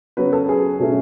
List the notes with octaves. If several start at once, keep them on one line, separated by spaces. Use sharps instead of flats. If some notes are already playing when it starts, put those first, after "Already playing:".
C#3 F#3 B3 B4
A4
G#4
B2 F#3 A3 C#4